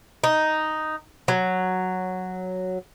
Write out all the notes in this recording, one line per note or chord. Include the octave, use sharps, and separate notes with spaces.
D#4
F#3